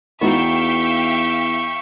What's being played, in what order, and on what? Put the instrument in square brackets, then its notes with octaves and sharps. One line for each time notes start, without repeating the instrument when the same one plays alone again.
[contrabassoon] E2 [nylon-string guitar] B3 D#4 F#4 [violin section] E5 F5 G5 [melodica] C#6